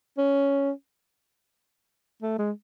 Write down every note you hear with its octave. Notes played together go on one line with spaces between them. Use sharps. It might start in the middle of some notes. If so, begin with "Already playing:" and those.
C#4
A3
G#3